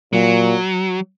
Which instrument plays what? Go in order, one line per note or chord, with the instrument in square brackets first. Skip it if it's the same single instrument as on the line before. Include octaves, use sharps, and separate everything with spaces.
[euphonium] A#2 [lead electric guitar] F#3